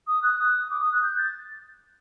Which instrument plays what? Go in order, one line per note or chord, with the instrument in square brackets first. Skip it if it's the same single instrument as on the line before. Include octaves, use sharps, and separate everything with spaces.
[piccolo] D#6
F#6
D#6
D6
D#6
F#6
G6
A6